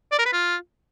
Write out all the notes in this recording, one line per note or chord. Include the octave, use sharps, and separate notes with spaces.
D5
A#4
B4
F4